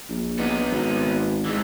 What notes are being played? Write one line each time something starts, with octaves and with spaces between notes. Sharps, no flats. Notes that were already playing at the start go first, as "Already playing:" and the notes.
A#1
B3 D#4
G#1
E3 G#3